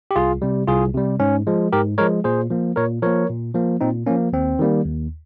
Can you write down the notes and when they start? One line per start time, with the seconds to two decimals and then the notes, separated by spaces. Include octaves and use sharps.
0.11 G4
0.16 C2 F4 G#4
0.42 C3 G3
0.67 C2 F4 G#4
0.94 C3 G3
1.20 G#2 C#4
1.47 F3 G#3
1.72 G#2 G4 A#4
1.98 F3 G#3 A#4 C#5
2.24 A#2 G#4 C5
2.50 F3 A#3
2.76 A#2 A#4 C#5
3.02 F3 A#3 A#4 C#5
3.29 A#2
3.55 F3 A#3
3.81 A#2 C4 D#4
4.06 F3 A#3 C#4
4.33 D#2 C4
4.59 D#3 G3 A#3
4.86 D#2